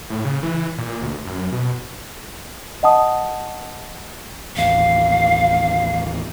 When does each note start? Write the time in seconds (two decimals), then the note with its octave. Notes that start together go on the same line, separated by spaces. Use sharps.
0.10 A2
0.25 C#3
0.43 E3
0.78 A#2
1.02 D2
1.25 F#2
1.52 B2
2.83 D#5 F#5 A5 D#6
4.57 D#1 A1 F5